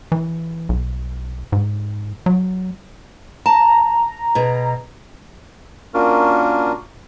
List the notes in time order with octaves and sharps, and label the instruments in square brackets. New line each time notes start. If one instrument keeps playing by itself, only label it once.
[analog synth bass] E3
B1
G#2
F#3
[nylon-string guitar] A5 [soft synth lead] A#5
[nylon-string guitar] B2 G#4
[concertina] A#3 C#4 D4 F4 F#4 A#4